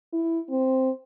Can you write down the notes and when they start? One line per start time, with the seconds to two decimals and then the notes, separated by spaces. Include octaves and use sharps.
0.13 E4
0.50 C4